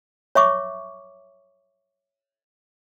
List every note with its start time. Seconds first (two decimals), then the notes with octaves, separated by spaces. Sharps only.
0.35 C#5 E5 C#6 D6